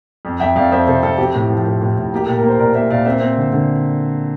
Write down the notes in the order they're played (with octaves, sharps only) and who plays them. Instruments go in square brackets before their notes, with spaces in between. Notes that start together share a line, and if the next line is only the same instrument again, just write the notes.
[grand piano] F2
F2 E5 G5
F2 D5 F5
F2 C5 E5
C3 A4 C5
F2 A4
C4 G4
A2
F3
A2
A2
A2
A#3 G4
A#2 A4
A#4
A#3
C5
A#2 A#4 D5
A#3 C5 E5
A#2 D5 F5
C4 C5 E5
C4
D3
D3